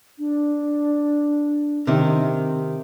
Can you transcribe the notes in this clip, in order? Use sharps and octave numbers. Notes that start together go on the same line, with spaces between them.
D4
C3 D#3